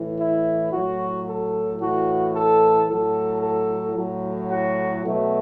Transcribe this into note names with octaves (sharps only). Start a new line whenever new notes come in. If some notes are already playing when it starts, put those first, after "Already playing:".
Already playing: A2 E3
E4
A2 F#3 F#4
A4
A2 E3 F#4
A4
A2 F#3 A4
A4
A2 F#3
F#4
B2 F#3 A3